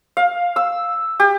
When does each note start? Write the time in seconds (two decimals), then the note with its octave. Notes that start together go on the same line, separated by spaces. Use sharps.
0.17 F5
0.56 E6
1.20 G4